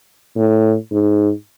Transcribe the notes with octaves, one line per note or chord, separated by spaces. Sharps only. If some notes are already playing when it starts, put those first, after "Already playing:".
A2
G#2